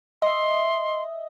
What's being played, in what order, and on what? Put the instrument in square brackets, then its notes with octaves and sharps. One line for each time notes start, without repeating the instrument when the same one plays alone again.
[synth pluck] D#5 E5 [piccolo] C6